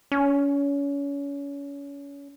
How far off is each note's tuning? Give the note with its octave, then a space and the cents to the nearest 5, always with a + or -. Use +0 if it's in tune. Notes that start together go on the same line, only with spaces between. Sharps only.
C#4 +30